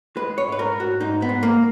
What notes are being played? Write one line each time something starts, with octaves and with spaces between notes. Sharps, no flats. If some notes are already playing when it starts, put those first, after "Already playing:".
G#3 B4
C#5
G#2
B4
A#4
G#2
F#4
G#2 D#4
B3
G#2
A#3